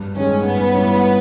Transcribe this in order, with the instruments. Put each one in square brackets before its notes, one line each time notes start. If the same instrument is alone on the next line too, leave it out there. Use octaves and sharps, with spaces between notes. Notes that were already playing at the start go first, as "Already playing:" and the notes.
Already playing: [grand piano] G2
[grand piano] D#3 G#3 [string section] C#4
[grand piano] G2 [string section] B3
[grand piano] E3 G3 C#4